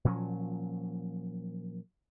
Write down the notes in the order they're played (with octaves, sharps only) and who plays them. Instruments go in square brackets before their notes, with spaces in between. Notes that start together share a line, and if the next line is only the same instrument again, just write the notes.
[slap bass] A#2 F3 F#3 C#4